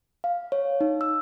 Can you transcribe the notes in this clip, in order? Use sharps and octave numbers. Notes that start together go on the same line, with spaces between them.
F5
C#5
D#4
E6